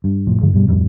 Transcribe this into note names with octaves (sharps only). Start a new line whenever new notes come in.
G2
F1 A2 F3
G2 D3 F3 G#3
G2 B2 G3
D1 F2 G3